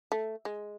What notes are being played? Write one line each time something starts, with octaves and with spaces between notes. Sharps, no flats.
A3
G#3